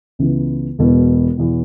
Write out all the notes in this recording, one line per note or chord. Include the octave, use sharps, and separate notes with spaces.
C#2 C#3 E3 B3
E1 E2 B2 B3
E2 B2 B3